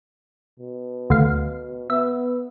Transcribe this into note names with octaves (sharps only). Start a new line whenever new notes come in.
B2
D2 F5
B3 E5